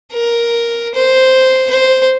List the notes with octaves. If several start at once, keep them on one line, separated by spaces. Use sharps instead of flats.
A#4
C5
C5